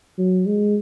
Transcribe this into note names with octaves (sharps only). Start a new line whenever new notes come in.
F#3
G#3